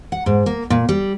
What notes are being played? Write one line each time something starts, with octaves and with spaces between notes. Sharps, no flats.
F#5
G#2
A#3
A#2
G3